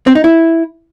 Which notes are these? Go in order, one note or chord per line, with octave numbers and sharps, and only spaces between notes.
C4
D#4
E4